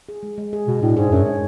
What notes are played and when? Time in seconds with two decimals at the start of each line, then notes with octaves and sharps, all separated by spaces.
0.09 G#4
0.23 G#3
0.38 G#3
0.53 G#4
0.67 B2 G#3
0.82 A2 D4
0.97 G#2 G#4
1.11 F#2 C#5
1.26 G#3